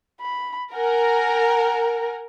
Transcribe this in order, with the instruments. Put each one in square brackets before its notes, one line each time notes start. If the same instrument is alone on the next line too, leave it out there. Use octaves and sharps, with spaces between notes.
[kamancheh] B5
[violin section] A#4 [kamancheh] F#5 G#5